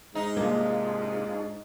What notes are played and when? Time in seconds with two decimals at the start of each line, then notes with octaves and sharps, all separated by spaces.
0.15 G#2 D#4
0.37 C3 A#3 D4 F4 G#4